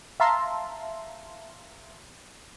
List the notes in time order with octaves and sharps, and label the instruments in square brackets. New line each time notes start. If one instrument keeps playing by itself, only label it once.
[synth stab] E5 F5 A5 A#5 C6